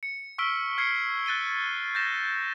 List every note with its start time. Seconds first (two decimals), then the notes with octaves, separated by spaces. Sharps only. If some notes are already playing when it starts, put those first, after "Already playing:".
0.03 C#7
0.38 C#6 E6 F6 B6 D7 G7
0.78 F6 G#6 C7 C#7
1.26 F#6 A6 D#7 G7
1.95 G6 A6 A#6 E7